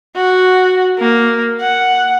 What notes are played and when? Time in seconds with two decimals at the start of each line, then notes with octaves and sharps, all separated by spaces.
0.16 F#4
0.99 A#3
1.61 F#5